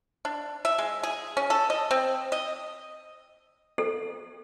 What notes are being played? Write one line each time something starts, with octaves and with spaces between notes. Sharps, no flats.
D4
E5
G#3
G#4
C#4
A4
D#5
C4
D#5
A4